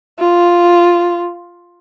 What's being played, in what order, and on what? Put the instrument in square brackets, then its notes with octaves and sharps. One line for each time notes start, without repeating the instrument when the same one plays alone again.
[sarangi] F4